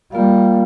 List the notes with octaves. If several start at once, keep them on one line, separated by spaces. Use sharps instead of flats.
G3 A#3 F4 A#4 F5